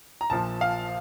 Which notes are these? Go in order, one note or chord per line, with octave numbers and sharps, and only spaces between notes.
A#5
A#1 A#2 F3 A5
F5